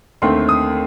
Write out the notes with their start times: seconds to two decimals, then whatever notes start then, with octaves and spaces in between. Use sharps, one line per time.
0.22 D#2 D3 A3 C4 D#4 C6
0.49 D#6